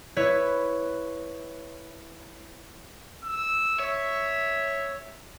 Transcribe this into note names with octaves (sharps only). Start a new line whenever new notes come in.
E4 B4 C#5
E6
C#5 E5